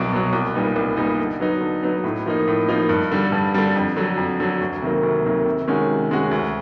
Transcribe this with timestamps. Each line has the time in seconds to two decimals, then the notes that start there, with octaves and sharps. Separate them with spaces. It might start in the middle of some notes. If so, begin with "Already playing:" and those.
Already playing: C2 B2 F#3
0.12 B2 F#3
0.33 C2
0.55 A#2 G3 B3 D#4
0.76 C2
0.97 A#2 G3 B3 D#4
1.19 D3
1.40 F#3 B3 D#4
1.61 D3
1.83 F#3 B3 D#4
2.04 A2
2.26 F3 A#3 D#4
2.48 A2
2.69 F3 A#3 D#4
2.89 G2
3.11 D3 G3
3.32 G2
3.54 D3 G3
3.76 F2
3.96 D3 F#3
4.17 F2
4.40 D3 F#3
4.61 D2
4.82 C3 D#3 F#3 A#3
5.03 D2
5.25 C3 D#3 F#3 A#3
5.46 C3
5.68 D#3 G#3 C#4 F#4
5.90 C3
6.11 D#3 G#3 C#4 F#4
6.31 D2